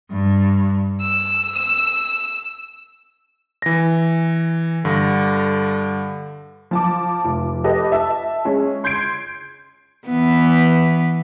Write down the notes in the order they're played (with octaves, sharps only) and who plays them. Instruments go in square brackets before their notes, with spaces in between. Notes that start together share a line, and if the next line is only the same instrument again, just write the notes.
[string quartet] G2
E6
E6
[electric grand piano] E3 A#6
[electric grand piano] G2 A#6 [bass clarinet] D3
[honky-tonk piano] F3 A5 D6
F1
G4 A4 B4 D#5
E5 A5 E6
G#3 C#4
C6 G6 G#6 C7 D7
[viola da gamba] E3 B3